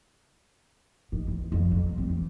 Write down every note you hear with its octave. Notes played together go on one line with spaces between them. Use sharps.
D#3
E2
F2
F#3
C4
E3